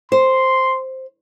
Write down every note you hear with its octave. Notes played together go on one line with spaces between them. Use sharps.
C5 C6